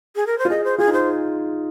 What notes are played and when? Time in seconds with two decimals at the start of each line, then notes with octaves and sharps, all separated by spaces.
0.16 G#4
0.27 A#4
0.38 C5
0.45 F4
0.50 G#4 D#5
0.64 C5
0.78 F4 G#4
0.88 D#4
0.93 C5